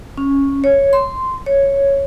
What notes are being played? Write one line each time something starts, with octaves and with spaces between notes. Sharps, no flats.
C#4
C#5
C6
C#5